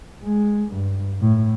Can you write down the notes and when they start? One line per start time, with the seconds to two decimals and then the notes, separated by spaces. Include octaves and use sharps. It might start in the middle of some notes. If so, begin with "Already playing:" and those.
0.23 G#3
0.72 G2
1.21 A2